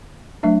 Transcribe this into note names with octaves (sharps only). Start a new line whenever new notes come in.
F#3 A3 D4 E5